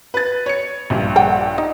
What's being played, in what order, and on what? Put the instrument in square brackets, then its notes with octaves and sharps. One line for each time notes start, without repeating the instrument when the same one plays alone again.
[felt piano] B4 A6
C#5 C#7
A#1 G2
[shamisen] D5 F#5 G5
D#4